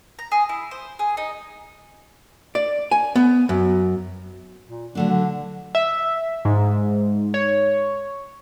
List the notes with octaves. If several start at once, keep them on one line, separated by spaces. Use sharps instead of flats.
A#5
G#4
E4
C5
G#4
D#4
D5
G#5
B3
F#2
A#2
D3 F#3 A3 D4
D3
E5
G#2
C#5